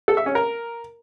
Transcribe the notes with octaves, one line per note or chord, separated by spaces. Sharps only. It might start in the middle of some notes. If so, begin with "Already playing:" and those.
A4
E5
C#4
A#4